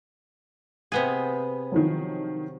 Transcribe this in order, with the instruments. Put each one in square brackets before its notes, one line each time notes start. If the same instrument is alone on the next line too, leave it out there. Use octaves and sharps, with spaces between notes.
[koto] C3 B3 G#4
[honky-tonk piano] D#3 F3 F#3